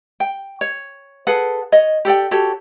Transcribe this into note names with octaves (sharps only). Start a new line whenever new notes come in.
G5
C#5
G#4 A4 B4 F#5
C#5 D#5
G4 A4 D5 G5
F#4 G4 A4 C#5